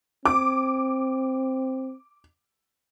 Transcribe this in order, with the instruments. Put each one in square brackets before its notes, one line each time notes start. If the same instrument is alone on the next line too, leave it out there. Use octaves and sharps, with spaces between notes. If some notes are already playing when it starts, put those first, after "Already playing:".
[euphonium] C4 [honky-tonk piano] D6